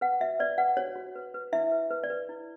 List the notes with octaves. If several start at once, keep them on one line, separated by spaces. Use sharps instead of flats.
B4 F#5
F#4 E5
B4 D5
B4 F#5
F#4 C#5
F#4
B4
B4
E4 E5
B4
B4
D5
B4
E4